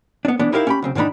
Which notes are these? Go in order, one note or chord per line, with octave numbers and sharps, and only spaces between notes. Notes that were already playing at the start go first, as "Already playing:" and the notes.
B3 D4
E3 B3 D4
D#4 E4 G4 A#4 D5 F5
C#4 G4 B5
B1 C#3 C4
G#2 D#3 E3 D4 D#4 B5